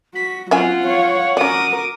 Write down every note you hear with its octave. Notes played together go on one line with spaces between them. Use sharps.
F#4 B6
F#3 C4 C#4 F4 E5 F#5 G#5
C#5 F5
C#4 F#4 A#4 D5 D6 D#6